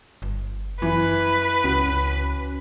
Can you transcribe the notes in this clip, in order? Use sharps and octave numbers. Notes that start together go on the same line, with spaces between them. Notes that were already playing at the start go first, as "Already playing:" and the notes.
G1
F#2 E3 B4
C#2 C#4 F#4